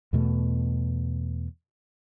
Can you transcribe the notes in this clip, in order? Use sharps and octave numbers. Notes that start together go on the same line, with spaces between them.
E2 B2 A3